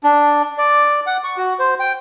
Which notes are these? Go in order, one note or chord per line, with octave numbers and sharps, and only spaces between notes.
D4
D5
F#5
C#6
F#4
C5
G5